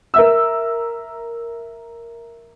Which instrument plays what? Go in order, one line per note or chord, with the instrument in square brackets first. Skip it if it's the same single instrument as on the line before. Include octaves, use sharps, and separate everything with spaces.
[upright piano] A#4 E5 E6